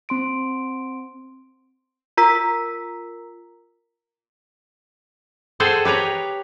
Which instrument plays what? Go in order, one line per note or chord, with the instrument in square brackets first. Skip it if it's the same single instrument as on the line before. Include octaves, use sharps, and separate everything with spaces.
[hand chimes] C4 C6 D7
[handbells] F4 A#4 A#5 E6 B6
[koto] G#4 A4 C5 F#5 G5
G4 B4 C#5 A#5